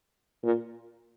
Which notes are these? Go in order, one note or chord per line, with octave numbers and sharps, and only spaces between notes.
A#2